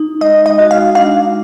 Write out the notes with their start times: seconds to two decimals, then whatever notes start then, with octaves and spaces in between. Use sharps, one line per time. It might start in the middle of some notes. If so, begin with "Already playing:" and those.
Already playing: D#4
0.21 G#3 D#5
0.46 D#5
0.59 F#4
0.71 F5
0.95 D4 F5